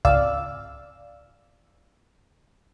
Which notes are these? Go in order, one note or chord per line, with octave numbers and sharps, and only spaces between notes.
G#1 C#2 D5 F5 E6